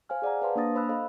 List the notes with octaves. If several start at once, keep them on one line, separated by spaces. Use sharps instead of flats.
C5 F5 G#5 F6
G#4 D5 F#5 A#5
B4 C5 F5 A5 C6
A#3 D4 C5 D#6 A6 A#6
C5 B5 E6 F#6
A4 C5 D#5 F5 B5